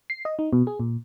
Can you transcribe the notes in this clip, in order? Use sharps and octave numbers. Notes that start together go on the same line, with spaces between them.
C7
D#5
D#4
B2
G#4
A#2